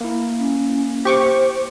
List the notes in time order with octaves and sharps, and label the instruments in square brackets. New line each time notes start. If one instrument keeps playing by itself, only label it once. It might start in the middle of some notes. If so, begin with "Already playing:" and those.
[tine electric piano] A#3 E4
[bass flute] C#4
[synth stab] G4 C#6 D6 [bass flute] C5